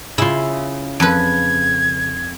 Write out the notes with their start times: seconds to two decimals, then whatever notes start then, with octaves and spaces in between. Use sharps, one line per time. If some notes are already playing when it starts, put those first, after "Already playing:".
0.18 C#3 E4 F4
1.00 F2 B4 G#6